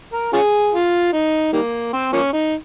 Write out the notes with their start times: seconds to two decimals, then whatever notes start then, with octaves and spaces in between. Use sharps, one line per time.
0.14 A#4
0.33 C#4 F4 G#4
0.73 F4
1.13 D#4
1.52 D#3 G3 A#3
1.93 C4
2.13 F3 A#3 C#4
2.33 D#4